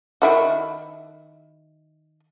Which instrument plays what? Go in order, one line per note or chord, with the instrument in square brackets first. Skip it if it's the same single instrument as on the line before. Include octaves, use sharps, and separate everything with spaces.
[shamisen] D#3 E4 F#4